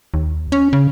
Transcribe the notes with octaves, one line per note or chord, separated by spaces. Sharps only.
D#2
C#4
C#3